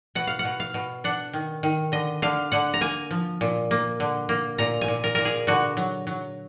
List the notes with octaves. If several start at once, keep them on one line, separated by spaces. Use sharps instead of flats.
B2 F#5
F5
F#5
B2
F5
B2
D4 F#5
D#3
D#3
D3 D#5
D3 F5
D3 F#5
A#5
A#3 G#5
F3
A#2
A#3
D3
A#3
A#2 A#5
G#5
A#2
A#4
A#2 A#4
G#4
D3 F#4
F#3
F#3